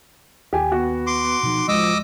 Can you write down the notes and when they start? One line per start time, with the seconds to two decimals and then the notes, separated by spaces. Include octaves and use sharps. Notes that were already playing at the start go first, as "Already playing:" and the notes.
0.53 D#2 G4 G#5
0.72 B3 F#4
1.07 C6 D6
1.43 B2 F3 D#4
1.68 D1 F3 G#3 D#5 D6 E6